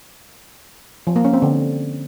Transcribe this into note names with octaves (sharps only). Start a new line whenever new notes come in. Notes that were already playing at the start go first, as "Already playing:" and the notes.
F3
A#3
C#4
C4
D3